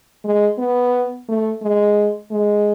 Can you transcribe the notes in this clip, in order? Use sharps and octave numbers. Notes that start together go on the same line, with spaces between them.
G#3
B3
A3
G#3
G#3